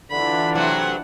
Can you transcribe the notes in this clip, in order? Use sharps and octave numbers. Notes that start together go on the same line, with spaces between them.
D3 E3 D4 F4 B5
C3 F#3 A3 F#5